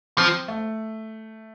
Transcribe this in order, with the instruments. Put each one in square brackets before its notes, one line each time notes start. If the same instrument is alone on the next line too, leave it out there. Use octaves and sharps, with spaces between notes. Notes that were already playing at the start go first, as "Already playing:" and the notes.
[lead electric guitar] F3 [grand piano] C4
[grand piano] A3